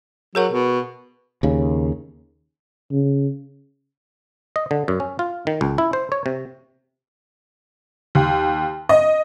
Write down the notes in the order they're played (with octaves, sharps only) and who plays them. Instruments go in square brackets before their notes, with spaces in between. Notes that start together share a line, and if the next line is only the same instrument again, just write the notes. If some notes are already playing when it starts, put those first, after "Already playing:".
[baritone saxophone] F#3 [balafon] G#4 A#4 F#5
[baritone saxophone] B2
[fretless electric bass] D#2 C#3
[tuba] C#3
[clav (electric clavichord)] D#5
D3
F#2
C#4
F4
D#3
C#2
E4
C5
C#5
C3
[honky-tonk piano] D#2
D#5